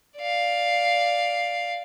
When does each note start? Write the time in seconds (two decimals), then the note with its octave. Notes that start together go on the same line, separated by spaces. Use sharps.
0.18 D5 F5